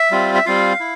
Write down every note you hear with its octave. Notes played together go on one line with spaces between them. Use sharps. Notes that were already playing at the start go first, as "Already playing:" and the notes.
Already playing: E5
G3 C4 F4
E5
G3 C4 F4 F5
E4